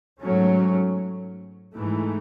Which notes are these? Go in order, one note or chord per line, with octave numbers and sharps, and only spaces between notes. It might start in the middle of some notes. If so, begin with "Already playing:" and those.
G#2 F#3 A3 C#4
G#2 E3 A3